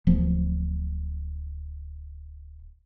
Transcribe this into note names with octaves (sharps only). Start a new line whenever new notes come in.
D1 F3 B3